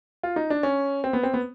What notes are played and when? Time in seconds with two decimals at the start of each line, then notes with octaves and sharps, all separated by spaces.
0.23 F4
0.36 D#4
0.50 D4
0.63 C#4
1.04 C4
1.13 B3
1.23 C4
1.34 B3